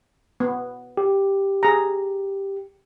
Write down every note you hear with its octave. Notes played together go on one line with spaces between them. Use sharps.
B3
G4
G#4 A#5